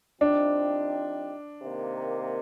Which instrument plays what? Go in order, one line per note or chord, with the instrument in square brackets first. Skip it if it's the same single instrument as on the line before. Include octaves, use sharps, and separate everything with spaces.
[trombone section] F3 C4 D#4 G4 [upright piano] D4
[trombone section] C3 D#3 A#3